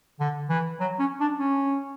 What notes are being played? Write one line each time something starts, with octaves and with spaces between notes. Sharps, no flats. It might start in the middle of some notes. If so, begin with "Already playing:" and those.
D3
E3
F#3
C#4
D4
C#4